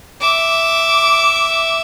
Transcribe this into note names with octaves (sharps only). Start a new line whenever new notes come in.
E5 D6